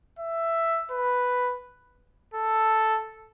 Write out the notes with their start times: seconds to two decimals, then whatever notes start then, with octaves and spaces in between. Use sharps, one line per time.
0.19 E5
0.91 B4
2.34 A4